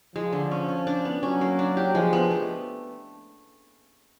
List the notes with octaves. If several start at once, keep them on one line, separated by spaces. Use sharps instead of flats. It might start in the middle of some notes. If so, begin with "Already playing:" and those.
F3 G#3
D3
C#4
C#4
D4
B3
F#3 C#4
A#3
D4
G4
F3 G#3
B3
A3